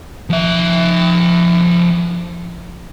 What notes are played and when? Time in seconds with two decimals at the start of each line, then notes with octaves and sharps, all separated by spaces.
0.30 F3 E5